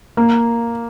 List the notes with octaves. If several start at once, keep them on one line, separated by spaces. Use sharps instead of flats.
A#3